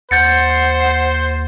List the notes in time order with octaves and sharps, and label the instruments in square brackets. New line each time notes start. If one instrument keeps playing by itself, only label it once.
[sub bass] D#2 [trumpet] C5 [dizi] F#5 [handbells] G6 A6 C#7